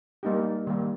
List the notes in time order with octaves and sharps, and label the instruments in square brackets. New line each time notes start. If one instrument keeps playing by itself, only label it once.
[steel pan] G3 A#3 D#4 G4
D#3 G3 A#3